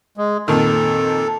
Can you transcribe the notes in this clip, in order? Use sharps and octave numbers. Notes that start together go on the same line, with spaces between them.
G#3
F2 A#2 D#3 A4